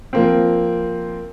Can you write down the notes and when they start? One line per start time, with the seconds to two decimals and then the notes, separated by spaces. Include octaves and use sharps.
0.13 F3 A#3 C4